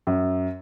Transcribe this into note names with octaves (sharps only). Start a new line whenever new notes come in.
F#2